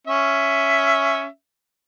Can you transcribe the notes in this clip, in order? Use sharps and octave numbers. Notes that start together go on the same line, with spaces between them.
C#4 E5